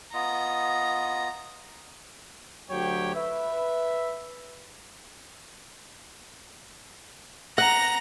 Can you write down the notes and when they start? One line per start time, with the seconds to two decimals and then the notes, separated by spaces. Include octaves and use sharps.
0.14 B3 F4 D#5 A#5
2.71 D2 F#3 G4 C#5 G5
3.15 B4 E5
7.58 F#5 A#5 A#6